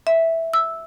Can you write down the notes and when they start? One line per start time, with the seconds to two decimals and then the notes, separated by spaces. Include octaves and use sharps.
0.07 E5
0.54 E6